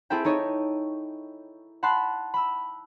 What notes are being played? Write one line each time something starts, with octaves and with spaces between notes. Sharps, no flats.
C4 E4 G#4 A4 E5 G5
D#4 A4 C#5 D#5
F#5 A5 B5 C6 F#6
B5 E6